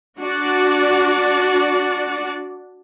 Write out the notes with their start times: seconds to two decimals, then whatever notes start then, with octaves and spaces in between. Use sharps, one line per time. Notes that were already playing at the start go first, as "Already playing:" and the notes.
0.19 D4 F#4 D5